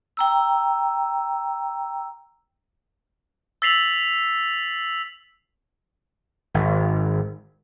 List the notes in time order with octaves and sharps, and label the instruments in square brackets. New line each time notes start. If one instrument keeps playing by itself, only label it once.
[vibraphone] G5 A#5 E6
[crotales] E6 A6 B6 C7 F7 F#7
[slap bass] G#1